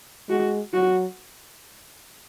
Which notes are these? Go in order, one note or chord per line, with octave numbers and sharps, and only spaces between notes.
G#3 F#4
F#3 F#4